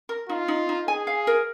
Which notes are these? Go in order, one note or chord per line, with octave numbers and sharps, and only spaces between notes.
A#4
D#4 F4
D#4
D#4
G#4 G#5
F5
A#4